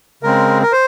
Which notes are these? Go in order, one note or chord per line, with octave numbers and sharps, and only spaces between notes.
C#3 G#3 C4 A#4
A#4
C5